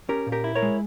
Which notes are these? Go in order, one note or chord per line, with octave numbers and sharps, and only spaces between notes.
C#4 G4 A#4
A#2
G4 A#4
E4
A#4 C#5
G#3